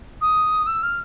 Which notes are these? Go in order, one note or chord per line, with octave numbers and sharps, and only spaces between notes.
D#6
E6
F6